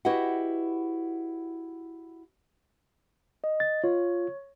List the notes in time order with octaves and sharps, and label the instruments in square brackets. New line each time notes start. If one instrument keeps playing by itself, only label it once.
[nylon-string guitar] E4 F#4 G4 B4 D#5 F#5
[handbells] D#5
[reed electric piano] A6
[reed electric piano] F4 [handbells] C#5